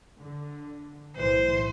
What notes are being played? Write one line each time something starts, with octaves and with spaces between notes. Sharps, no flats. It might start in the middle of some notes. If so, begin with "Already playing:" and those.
D3
B1 A2 E3 C5